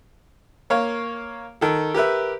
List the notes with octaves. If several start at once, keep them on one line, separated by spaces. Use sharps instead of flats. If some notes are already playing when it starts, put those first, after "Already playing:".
A#3 C#5 F5
D#3 A4
G4 A#4 B4 E5